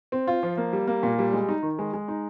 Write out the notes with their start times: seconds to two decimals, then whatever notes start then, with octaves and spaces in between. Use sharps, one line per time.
0.12 C4
0.27 F4
0.43 F3
0.57 A#3
0.73 G3
0.87 A#3
1.03 A#2
1.19 G3
1.33 G#3
1.49 D#4
1.63 D#3
1.79 G#3
1.93 G#3
2.08 D#4